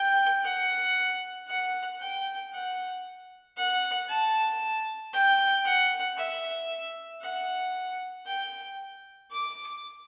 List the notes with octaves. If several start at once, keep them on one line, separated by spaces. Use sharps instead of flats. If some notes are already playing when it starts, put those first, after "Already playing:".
Already playing: G5
F#5
F#5
G5
F#5
F#5
A5
G5
F#5
E5
F#5
G5
D6